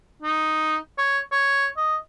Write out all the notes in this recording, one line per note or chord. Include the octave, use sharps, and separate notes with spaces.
D#4
C#5
C#5
D#5